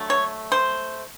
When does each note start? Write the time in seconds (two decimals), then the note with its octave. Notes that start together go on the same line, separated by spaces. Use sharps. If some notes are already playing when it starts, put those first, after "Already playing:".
Already playing: D3 F#3 A3
0.10 C#5
0.52 C5